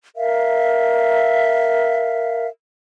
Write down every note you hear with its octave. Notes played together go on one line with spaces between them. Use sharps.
A#4 E5 F5